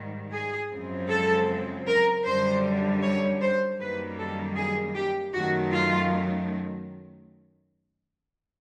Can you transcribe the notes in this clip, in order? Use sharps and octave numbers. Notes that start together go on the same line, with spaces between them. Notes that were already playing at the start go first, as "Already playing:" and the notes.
Already playing: G#2 D#3 G3
G#4
F#2 C#3 F3 G#3 C4
A4
A#4
F#2 D3 G3 C5
C#5
C5
F#2 D#3 G3 A#3 B4
A4
G#4
G4
F#2 D#3 F#3 A3 F#4
F4